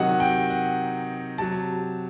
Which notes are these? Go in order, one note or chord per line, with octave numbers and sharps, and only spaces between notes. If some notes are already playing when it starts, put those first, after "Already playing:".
Already playing: C3 D#3 F#3 D#5 F#5
G5
F#5
C3 F#3 A5